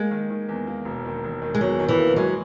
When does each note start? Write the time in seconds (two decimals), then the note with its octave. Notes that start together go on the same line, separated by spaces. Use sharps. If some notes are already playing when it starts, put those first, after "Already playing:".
Already playing: G#3 A#3
0.11 D#3
0.30 D#3
0.49 E2
0.67 A#3
0.85 E1
1.05 D#3
1.24 E1
1.42 D#3
1.55 G#3
1.61 E2 F#3
1.79 D#3
1.89 E3
1.98 A#3
2.16 F#3 G#3